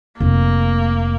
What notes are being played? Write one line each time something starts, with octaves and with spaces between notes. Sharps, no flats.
F1 A#3